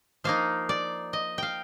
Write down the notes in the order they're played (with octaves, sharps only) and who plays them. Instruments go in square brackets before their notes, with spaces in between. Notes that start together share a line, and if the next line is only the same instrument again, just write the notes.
[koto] F3 A#3 D#4 F5
D5
D#5
F5 G5